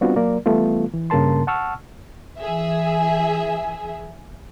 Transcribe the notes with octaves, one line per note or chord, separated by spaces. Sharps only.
G3 B3 C4 D4 F4 F#4
F#3 A#3 A#4 D5
E3 G3 A3 B3 F4
E3
G2 C#3 A#3 A#4 A5 C6
F#5 A5 C#6 E6 F6
E3 G#4 E5